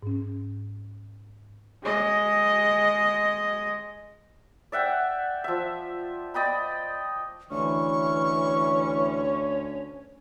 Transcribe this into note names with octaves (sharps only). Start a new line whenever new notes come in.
G#2 C#4
G#3 D#5
D5 E5 F#5 G5
F3 E5
D5 D#5 G5 B5
D2 E3 C#4 C#6